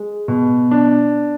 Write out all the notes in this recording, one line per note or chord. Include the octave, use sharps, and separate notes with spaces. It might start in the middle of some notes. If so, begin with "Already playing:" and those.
Already playing: G#3
B2
D4